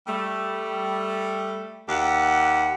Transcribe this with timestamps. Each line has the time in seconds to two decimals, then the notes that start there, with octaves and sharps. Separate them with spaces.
0.07 G3 A3
1.89 D#2 G4 F#5